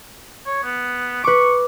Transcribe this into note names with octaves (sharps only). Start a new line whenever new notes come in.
C#5
B3
B4 C#6 D6